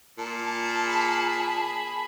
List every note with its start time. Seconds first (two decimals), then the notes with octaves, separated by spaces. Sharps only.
0.18 A#2 A5
0.83 G#4 B5